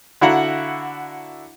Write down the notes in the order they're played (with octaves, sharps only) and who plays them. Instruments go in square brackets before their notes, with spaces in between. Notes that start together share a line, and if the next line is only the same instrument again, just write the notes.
[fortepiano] D3 E4 F#4 F5 F#5 A#5